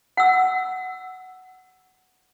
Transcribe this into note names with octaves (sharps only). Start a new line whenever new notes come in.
F#5 E6